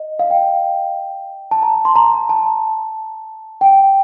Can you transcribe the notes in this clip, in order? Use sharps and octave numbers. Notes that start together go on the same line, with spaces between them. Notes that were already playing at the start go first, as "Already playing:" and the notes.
Already playing: D#5
F5
G5
A5
A#5
C6
A#5
A5
G5